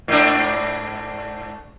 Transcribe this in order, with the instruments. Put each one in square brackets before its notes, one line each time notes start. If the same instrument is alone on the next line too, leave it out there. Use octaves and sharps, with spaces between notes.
[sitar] G#2 D4